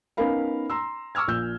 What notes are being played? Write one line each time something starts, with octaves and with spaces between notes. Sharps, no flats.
B3 C#4 D#4 A#4 F5 B5
A#5 C6 E6
C#6 D6 E6 F6 G#6
A#1 A#2 E6 G6